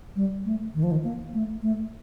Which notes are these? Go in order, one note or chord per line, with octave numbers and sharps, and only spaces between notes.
G3
A3
D#3
F3
D#3
A#3
A3
A3